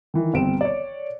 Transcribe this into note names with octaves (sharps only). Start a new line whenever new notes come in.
D#3 E3
G1 C4 D7 E7
C#5 D5